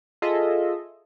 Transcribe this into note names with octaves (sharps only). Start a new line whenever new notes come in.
F4 G#4 A4 D#5 E5